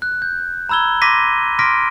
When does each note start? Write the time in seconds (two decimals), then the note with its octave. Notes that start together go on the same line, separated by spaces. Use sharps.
0.02 F#6
0.22 G6
0.69 A#5 B5 E6 G#6 G7
1.02 C6 D6 A#6 B6 D#7
1.59 C6 D6 F6 A#6 B6 D7